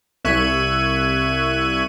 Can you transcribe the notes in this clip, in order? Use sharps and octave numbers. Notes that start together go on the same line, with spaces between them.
C2 E5 C#6 F#6 G#6 D#7